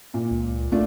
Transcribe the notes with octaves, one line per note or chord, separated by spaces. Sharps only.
A#2
C#2
C2 A3 D4 F4